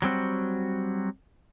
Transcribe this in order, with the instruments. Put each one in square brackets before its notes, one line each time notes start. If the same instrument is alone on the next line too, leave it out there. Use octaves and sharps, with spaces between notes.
[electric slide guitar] F#3 G3 C4 F#4